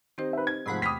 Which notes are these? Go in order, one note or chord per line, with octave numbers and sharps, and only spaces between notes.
D#3 C4 D#4 G4 C5
B4 E5
G#6
G#2 C3 F3 A3 F#5 B5 C6
E2 G5 B5 D6 D#6 F6 B6